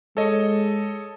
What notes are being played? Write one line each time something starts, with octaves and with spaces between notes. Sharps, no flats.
G#3 A4 C#5 D#5